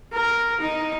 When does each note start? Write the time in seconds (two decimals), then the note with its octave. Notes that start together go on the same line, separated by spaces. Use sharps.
0.13 A#4
0.61 D#4